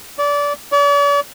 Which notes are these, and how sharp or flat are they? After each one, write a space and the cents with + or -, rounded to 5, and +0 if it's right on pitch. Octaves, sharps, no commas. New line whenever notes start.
D5 -25
D5 -45